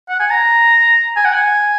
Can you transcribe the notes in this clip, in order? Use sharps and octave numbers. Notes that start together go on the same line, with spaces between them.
F#5
G#5
A#5
G#5
F#5
G#5